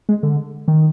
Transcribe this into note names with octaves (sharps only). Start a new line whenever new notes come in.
G#3
D3
D#3